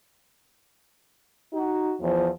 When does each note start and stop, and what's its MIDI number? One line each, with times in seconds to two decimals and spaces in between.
1.53 1.94 63
1.53 1.94 66
2.00 2.28 40
2.00 2.28 53